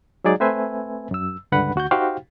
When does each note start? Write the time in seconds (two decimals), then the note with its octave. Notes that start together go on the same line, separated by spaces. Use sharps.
0.24 F#3 G#3 D#4 G#4 D5
0.40 A3 C4 B4 C5 E5 G#5
1.11 F#2 E6
1.52 C#2 G2 D3 B4 F#5 B5
1.76 D2 F#4 F#5 G6
1.91 D#4 F#4 G4 C5 F5 G5